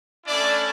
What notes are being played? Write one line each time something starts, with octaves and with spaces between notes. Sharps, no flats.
A3 C#4 D4 E4 D5